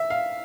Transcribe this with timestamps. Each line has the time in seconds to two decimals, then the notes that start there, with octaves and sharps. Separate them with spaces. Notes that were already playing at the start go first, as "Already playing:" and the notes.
Already playing: E5
0.10 F5